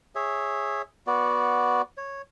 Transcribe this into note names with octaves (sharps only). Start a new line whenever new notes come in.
G#4 C#5 E5
B3 F#4 D5
C#5